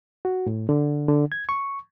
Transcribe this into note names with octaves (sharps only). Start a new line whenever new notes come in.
F#4
A2
D3
D3
G#6
C#6